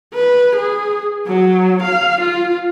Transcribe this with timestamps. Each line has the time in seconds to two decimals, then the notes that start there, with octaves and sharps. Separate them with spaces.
0.14 B4
0.55 G#4
1.27 F#3
1.82 F5
2.20 F4